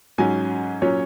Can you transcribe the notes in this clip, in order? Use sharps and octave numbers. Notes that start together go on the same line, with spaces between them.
G#2 F#3 C#4 G#5
A#2 F#3 C#4 C#5